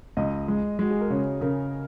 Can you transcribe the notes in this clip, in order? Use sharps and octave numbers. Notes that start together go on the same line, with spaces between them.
C#2 D#5
G#3
G#3 F#4
G#4
A#4
C#3 C#5
C#3 A#4